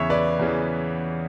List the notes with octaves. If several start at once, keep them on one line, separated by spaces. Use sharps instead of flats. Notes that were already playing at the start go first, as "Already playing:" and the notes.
Already playing: E2 C#3 E3 C#5 E5
B4 D5
E2 C#3 E3